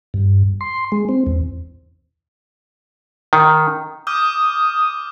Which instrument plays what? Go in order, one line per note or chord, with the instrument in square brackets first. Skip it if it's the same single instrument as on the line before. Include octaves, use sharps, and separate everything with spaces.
[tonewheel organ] G2
C6
G#3
C4
E2
[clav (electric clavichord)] D#3
[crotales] D6 F6 G6 [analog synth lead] D#6